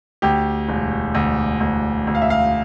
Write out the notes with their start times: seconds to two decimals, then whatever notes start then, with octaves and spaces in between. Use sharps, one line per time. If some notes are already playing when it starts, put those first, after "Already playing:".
0.22 D2 G4
0.68 E1
1.15 D2
1.60 D2
2.07 D2
2.15 F5
2.22 E5
2.30 F5